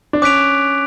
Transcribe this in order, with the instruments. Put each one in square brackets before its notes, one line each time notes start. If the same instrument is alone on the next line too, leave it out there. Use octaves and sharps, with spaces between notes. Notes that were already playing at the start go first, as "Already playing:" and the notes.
[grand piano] D4
[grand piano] C#4 [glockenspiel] D6 F#6 B6 D7 F7